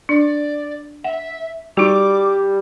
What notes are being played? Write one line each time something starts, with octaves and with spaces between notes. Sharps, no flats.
D4 D5
E5 F#5
G3 D#4 F#4 D6